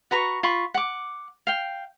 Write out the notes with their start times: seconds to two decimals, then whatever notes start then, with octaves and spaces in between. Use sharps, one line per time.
0.11 F#4 B4 A#5 C#6
0.43 F4 B5 C#6
0.74 F#5 D6
1.47 F5 G5